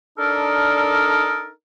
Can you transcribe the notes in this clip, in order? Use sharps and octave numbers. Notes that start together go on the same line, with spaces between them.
D4 D#4 A4 A#4